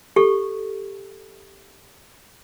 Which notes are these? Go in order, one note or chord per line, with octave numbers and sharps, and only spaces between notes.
G4 A4 C#6